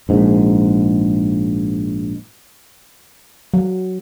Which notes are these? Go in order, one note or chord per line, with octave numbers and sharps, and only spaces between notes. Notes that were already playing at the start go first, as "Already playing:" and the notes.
A#1 G#2
F#3